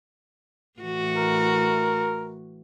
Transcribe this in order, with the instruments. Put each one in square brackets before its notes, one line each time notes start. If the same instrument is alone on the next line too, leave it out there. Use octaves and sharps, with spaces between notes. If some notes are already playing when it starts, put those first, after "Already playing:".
[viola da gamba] A2 E3 F#4
[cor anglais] A#4